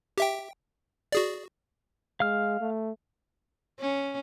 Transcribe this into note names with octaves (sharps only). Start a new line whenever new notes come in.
G4 E5 G5
F#4 G#4 D5
G#3 F5 F6
A3
C#4